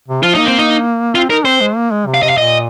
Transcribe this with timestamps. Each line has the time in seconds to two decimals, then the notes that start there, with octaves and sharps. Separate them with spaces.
0.08 C3
0.23 F3 F4
0.35 A#3 D#4
0.46 C4
0.58 D#4
1.15 C4 F4
1.30 D#4 A#4
1.45 C4 C5
1.60 G#3
1.76 A#3
1.91 G#3
2.07 C3
2.14 F5
2.22 C3 D#5
2.29 F5
2.37 A#2 D#5